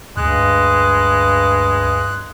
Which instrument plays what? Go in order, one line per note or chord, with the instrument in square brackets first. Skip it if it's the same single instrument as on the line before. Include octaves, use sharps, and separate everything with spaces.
[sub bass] D2 [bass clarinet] G2 [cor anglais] G#3 [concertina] F#6